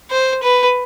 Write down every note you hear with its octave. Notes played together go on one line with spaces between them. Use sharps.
C5
B4